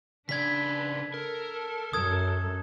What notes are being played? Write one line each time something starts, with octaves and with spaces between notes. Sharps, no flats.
C#3 D4 B4 D5 G#6 B6
A4 A#4
F#2 D#6 G#6